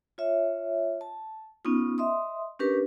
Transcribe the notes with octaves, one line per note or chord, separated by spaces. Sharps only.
F4 C#5 E5
A5
B3 C#4 D#4 F4
D#5 E5 C6 D#6
C#4 D4 G4 A#4 B4